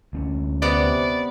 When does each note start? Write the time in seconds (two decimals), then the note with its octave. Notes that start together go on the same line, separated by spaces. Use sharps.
0.13 D2 C4 C#4
0.62 C3 B3 D5 F#5